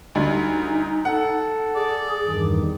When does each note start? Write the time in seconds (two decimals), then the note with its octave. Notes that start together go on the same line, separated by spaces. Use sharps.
0.15 D2 G3 D#4
1.05 A4 F#5
1.75 G#4 D5
2.25 E2 G2 D#3